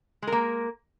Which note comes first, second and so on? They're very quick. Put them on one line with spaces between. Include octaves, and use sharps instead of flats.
G#3 A#4 A#3